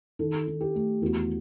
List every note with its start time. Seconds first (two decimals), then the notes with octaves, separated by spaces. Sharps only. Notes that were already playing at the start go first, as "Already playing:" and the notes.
0.19 D#3 A4
0.47 D#3
0.61 G4
0.75 A3
1.01 E2 F#4